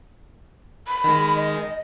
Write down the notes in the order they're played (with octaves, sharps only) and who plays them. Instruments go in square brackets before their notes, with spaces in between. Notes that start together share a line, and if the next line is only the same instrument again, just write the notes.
[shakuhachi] B5
[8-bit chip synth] D#3 G#3
[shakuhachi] D#5